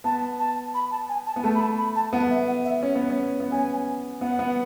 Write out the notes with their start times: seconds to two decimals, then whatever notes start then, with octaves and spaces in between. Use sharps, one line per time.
0.04 B3 A5
0.39 A5
0.74 B5
0.91 A5
1.09 G#5
1.26 A5
1.36 B3
1.44 A3 A5
1.55 B5
1.61 A5
1.78 B5
1.95 A5
2.13 B3 F#5
2.30 E5
2.48 F#5
2.65 E5
2.83 C#4
2.95 B3
3.10 C#4
3.40 B3
3.52 C#4 G#5
4.21 B3 F#5
4.39 B3